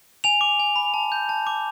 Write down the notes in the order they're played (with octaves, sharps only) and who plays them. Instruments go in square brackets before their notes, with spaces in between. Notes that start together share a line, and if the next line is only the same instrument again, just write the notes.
[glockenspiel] G#5 F7
D6
G#5
B5
A5
G6
A5
D6